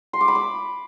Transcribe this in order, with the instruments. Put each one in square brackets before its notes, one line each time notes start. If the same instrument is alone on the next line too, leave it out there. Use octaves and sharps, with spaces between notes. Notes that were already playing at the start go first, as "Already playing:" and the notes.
[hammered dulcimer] C6
D6
B5
D6